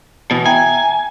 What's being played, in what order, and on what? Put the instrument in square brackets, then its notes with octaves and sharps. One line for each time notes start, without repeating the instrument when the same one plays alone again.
[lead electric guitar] B2 E3
[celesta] E5 G5 A#5 [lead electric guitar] G#5